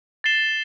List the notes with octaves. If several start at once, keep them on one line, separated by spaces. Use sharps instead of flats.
A6 C7 E7 G7